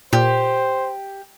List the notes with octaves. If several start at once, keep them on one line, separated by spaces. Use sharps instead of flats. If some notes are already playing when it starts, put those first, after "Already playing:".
A#2 G4 C5